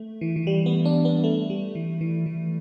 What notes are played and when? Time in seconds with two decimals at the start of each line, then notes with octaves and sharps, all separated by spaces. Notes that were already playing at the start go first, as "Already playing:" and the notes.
Already playing: A3
0.21 E3
0.36 E3
0.47 G3
0.66 B3
0.85 D4
1.05 B3
1.24 A3
1.50 G3
1.75 E3
2.01 E3
2.26 E3